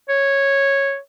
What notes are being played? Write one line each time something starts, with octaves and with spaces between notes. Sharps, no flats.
C#5